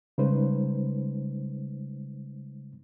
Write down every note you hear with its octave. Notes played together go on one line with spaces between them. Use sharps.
C#3 G3 G#3 D#4 B4 C5